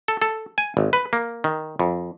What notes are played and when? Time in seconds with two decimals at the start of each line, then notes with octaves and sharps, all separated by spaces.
0.08 A4
0.22 A4
0.58 G#5
0.77 G#1
0.93 B4
1.13 A#3
1.44 D#3
1.79 F2